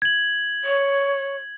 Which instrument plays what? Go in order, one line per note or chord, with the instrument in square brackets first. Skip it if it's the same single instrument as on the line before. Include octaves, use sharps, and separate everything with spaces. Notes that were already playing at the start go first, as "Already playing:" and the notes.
[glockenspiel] G#6 F#7
[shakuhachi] C#5